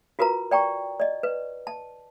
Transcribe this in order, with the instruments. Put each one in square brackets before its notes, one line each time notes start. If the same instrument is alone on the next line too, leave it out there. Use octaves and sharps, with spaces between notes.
[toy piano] F4 F#4 A#4 B4 A#5
D5 G5 A#5 C#6
D5 D#5
B4
A5